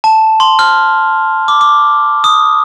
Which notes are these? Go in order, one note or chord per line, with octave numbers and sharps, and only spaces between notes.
A5
C6
F6
D6
D6
D#6